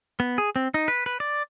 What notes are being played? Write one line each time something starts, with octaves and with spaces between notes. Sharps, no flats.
B3
G#4
C4
D#4
B4
B4
D5